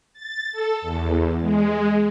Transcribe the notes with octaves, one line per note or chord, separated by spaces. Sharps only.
A6
A4
E2
G#3